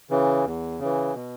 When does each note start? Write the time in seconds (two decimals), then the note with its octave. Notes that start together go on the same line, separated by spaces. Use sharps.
0.10 C#3 E3
0.45 E2
0.79 C#3 E3
1.15 B2